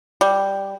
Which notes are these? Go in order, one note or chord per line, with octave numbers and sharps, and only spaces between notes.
G3